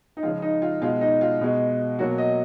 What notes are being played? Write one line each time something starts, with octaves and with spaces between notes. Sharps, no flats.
D#4
C#3 F3 G#3 F4
D#4
F4
B2 G#3 F4
D#4
F4
B2 G#3
B2 F#3 A#3 F#4
D#5